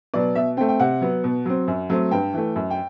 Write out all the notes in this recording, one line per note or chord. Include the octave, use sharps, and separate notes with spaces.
B2 F#3 B3 D5
B2 E5
A3 C4 G5
G5
C3 F#5
F#3 B3
B2
F#3 C4
F#2
F#3 A3 C4
G2 G5
E3 A3
F#2
G5